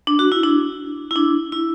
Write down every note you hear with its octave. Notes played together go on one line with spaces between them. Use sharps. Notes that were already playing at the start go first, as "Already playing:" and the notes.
D4
F#4
E4
D4
E4
D4
E4